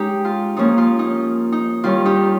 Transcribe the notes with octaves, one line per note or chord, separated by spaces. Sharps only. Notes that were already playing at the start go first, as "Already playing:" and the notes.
Already playing: G#3 C#4 D#4 G4
F4
F3 A#3 C#4 D#4
F4
D#4
D#4
D#3 G3 C#4 F4
D#4 G4